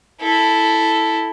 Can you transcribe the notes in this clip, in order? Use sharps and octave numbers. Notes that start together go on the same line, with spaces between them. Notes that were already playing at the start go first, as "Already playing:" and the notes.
E4 A4